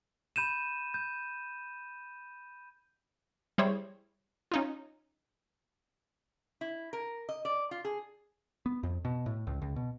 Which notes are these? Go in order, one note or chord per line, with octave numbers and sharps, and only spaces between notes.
B5 G6 D#7 E7
G6
G3 E4 G#4 C5 C#5
C#4 D#4 F4
E4
A#4
D#5
D5
F4
G#4
B3
F2
B2
A2
C#2
C#2
B2